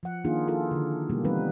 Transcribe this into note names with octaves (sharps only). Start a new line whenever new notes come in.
F3 F#5
D#3 A#3 D4 D#4 F4 G#4
E4 F4 G#4 A4
D3 D#3
B2 G3 G#3 A#3 G4
E3 G3 B3 C4 D#4 B4